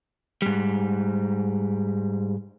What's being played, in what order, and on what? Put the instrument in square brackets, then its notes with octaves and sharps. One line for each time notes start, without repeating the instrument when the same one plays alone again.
[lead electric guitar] G#2 G3